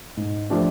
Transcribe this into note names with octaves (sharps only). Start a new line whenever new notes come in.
G#2
F3 A3 D4 G4